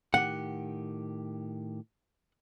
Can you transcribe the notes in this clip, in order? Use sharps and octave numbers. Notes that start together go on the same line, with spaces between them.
A2 D#3 G4 F#5